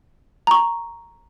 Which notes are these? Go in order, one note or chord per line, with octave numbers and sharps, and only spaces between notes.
A#5 C#6